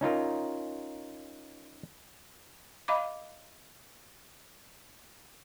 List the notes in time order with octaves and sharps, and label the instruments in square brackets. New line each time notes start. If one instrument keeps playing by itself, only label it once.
[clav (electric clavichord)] C#4 D#4 F4 A#4
[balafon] D#5 F5 B5 D6